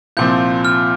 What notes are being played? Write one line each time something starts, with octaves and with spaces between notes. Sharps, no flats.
C2 A#2 F3 C4 G6
F6